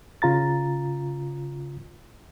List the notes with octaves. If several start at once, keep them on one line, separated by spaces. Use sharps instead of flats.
C#3 F4 A#5 A6